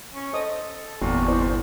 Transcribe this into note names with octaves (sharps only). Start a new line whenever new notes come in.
C#4
A4 C5 D#5 D#6
G1 E2 A#2 C4 F#4
E4 C5 D5